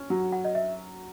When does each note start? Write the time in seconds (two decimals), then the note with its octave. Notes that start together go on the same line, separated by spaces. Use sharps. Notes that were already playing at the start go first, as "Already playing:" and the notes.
Already playing: C#4
0.10 F#3 F#5
0.32 F#5
0.45 D#5
0.55 E5